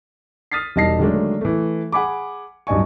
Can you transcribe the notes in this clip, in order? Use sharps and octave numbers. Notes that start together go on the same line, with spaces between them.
D#6 F6 A6 B6 C7
E1 G3 D#4 A5 A#6 C7
D3 D#3 F#3 G#3 A3 D4
E3 A3
G#4 F#5 G#5 B5 D6
D1 G2 D#4 D5 G#5 C#6